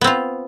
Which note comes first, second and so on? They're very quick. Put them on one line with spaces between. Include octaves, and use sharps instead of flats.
B3 C4 F4